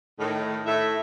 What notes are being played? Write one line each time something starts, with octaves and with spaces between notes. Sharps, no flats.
A2 D#3
A2 E5